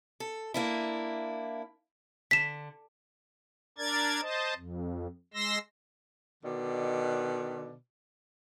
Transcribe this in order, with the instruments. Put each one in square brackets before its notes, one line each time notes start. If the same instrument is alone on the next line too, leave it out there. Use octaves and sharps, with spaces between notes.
[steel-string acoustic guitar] A4
A#3 D4 E4
[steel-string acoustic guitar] D3 [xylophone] B6 E7
[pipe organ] D4 A#4 D5 G#6 A6
C5 D#5 A5
F2
G#3 C6 E6 A#6
[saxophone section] B2 D3 D#3 D5